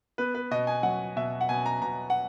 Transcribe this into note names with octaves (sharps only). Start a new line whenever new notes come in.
B3 B4
B4
B2 D#5
G#5
F#3 F#5
B2 E5
F#5
B2 G#5
A#5
B2 A#5
F#5